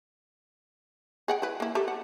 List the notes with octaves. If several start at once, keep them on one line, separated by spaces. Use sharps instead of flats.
G#4 F#5 G5
E4 B4
A#3 E4
G4 A4 E5
F#5